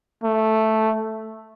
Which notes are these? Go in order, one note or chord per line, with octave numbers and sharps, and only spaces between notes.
A3